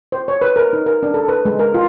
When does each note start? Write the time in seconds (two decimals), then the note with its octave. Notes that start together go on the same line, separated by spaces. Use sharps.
0.12 C5
0.28 C#5
0.42 B4
0.56 A#4
0.73 D#4
0.86 A#4
1.03 D4
1.14 A4
1.28 B4
1.45 G#3
1.59 A#4
1.74 F4